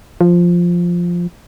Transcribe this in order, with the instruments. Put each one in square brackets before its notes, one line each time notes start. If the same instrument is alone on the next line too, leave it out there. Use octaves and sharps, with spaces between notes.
[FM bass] F3